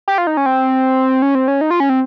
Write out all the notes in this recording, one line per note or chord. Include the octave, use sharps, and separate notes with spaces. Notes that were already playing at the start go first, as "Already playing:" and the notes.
G4
F4
D#4
C#4
C4
C#4
C4
C#4
D#4
F4
C#4
C4